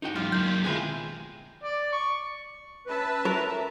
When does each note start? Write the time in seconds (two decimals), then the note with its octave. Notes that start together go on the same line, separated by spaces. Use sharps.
0.02 D#4 F#4 G5
0.16 E2 G#2 F4 G4
0.32 F#2 A#3 G6
0.65 B2 D#3 G#3 C4 E4 F4 G#4 C6
1.64 D5
1.93 C#6
2.87 C#4 B4 E5 A5
3.25 A#4